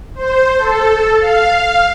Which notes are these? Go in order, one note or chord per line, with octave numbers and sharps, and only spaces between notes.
C5
A4
F5